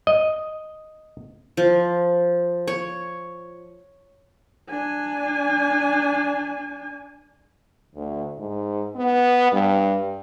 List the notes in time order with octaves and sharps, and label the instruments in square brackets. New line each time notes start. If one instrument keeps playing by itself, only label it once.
[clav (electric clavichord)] D#5
[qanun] F3
C#5
[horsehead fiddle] D4 G#5
[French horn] D2
G#2
B3
G2